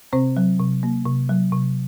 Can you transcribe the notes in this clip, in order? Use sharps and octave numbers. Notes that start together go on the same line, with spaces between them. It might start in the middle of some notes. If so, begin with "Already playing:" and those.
C3 C4 C5
F#3
C3
A#3
C3
F#3
C3